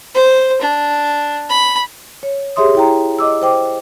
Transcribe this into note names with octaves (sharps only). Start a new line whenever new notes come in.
C5
D4
B5
C#5
G4 G#4 C#5 E5 C6 D#6
E4 G5 A#5
D#5 D6 E6
C5 G5 D6